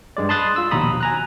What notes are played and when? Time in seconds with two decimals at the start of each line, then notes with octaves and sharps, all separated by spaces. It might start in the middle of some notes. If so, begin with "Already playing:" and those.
0.17 G2 G#3 D5
0.29 A5 B5 C6 D#6 F#6 A6
0.56 F4 E6
0.71 A#1 D#2 B2 A#5 B5 D#6
1.01 G#5 A#5 F#6